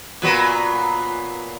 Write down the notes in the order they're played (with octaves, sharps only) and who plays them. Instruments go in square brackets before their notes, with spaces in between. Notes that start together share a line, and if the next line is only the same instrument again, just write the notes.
[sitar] A#2 F#3 B3